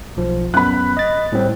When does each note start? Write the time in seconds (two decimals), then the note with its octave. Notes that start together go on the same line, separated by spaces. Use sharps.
0.17 B1 F3
0.54 F#2 B3 B5 F#6
0.97 D#5 A6
1.32 A2 G3 C4